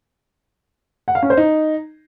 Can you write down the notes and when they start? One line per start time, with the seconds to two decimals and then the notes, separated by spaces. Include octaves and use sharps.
1.08 F#5
1.15 F5
1.23 C#4
1.30 C5
1.37 D#4